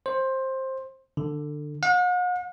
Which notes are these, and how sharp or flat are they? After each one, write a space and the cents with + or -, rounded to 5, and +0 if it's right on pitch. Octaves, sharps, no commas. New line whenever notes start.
C5 +15
D3 +20
F#5 -45